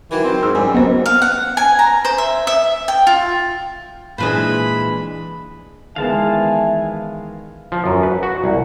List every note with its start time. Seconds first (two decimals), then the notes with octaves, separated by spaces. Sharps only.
0.11 D#3 E3 F#3
0.24 C4
0.42 G#2 E6 F6
0.55 F#2 G3 G#5
0.74 F#3 B3 C4 C5 D#5
1.06 F5
1.22 F#5
1.57 G#5
1.79 A#5
2.05 C5
2.18 E5
2.47 E5
2.88 G5
3.07 F4
4.18 A#2 E3 G#3 D4 B4 C5 B5
5.96 D#3 E3 G#3 B3 E5 F5 G#5 A5
7.72 F3
7.86 F#2
8.03 B4
8.23 F#4
8.44 C2